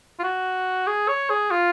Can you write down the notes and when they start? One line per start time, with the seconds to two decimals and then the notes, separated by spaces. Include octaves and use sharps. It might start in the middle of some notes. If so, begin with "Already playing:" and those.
0.19 F4
0.24 F#4
0.87 G#4
1.08 C#5
1.30 G#4
1.51 F4